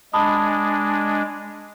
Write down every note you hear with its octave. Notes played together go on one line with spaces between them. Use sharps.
G#3 D4 A5 B5 D#6